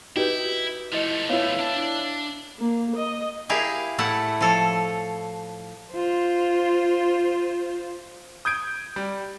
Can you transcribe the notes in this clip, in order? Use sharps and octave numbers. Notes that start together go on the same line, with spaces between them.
D#4 E4 F#4 G4 B4 G6
F3 A3 E4 D#5 C#7
B3 E4 C#5 F5
D4 A5
A#3
D#5
E4 G4 G#4 A#4 E5 F5
A2 A3 E4 F#5 A5
F3 A4 C#5
F4 C5
D#6 G6 G#6 D7
G3